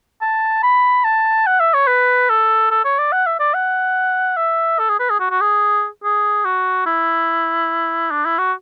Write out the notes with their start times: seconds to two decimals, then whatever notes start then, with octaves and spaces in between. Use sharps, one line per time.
0.21 A5
0.63 B5
1.05 A5
1.47 F#5
1.60 E5
1.74 C#5
1.87 B4
2.30 A4
2.71 A4
2.85 C#5
2.99 D5
3.12 F#5
3.27 E5
3.40 D5
3.54 F#5
4.37 E5
4.79 A4
4.89 G#4
5.00 B4
5.10 G#4
5.20 F#4
5.31 F#4
5.41 G#4
6.04 G#4
6.45 F#4
6.86 E4
8.11 D4
8.25 E4
8.38 F#4